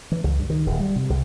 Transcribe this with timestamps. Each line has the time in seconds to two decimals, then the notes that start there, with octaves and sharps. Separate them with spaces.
0.12 E3
0.24 C#2
0.38 G2
0.50 D#3
0.66 D1
0.79 G3
0.96 C3
1.10 C2